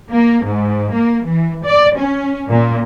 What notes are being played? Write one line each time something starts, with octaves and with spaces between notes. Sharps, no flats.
A#3
G#2
A#3
E3
D5
C#4
A#2